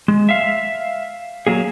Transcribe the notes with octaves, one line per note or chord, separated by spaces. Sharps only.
G#3
E5 F5
F#3 A#3 G#4